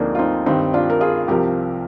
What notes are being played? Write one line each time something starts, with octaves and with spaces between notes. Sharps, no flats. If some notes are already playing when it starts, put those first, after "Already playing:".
Already playing: D2 D3 F3 G#3 A#3 C4 D4 D#4
F4
C4 D#4
G2 D#3 C4 D#4
D4 F4
A#4
F4 G#4
C2 C3 F3 G4 A#4